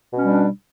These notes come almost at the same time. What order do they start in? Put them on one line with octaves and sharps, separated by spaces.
B2 C#4 G3 D4